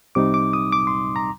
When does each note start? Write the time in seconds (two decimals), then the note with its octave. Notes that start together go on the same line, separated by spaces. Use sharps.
0.15 C2 C3 G3 C4 D#4 D6
0.34 D6
0.53 D#6
0.72 D6
0.87 C6
1.16 A#5